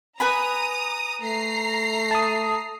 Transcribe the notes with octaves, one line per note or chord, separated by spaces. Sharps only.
B4 G#5 A#5 B5 D#6
A3 A#5 C7
A5 D#6